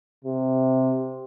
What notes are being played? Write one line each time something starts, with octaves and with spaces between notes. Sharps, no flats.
C3